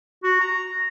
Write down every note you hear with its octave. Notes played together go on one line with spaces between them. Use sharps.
F#4
A#5